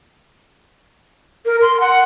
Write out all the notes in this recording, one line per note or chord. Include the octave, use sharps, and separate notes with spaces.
A#4
C6
F#5